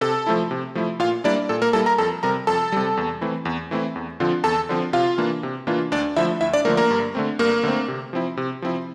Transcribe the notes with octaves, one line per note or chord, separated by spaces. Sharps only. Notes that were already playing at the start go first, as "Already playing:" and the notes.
C3 A4 A5
F3 A3 E4
C3
F3 A3 E4
A#2 F4 F5
G3 A#3 D4 E4 D5
A#2 A4
A#3 A#4
G3 A#3 E4 A4 A5
A#4 A#5
F2 A4 A5
C3 G3 A#4 A#5
F2 A4 A5
C3 G3
E2
E3 A3 C4 E4
E2
E3 A3 C4 E4
E2
D3 F3 C4 F4
E2 A4 A5
D3 F3 C4 F4
C3 F4 F5
E3 A#3 D4 F4
C3
E3 A#3 D4 F4
D2 D4 D5
D3 F3 A3 E4 E5
D2 E4 E5
D4 D5
D3 F3 A3 A#3 A#4
A#3 A#4
G2
D3 A3 C4
G2 A#3 A#4
D3 A3 C4
C3
F3 C4 E4
C3
F3 C4 E4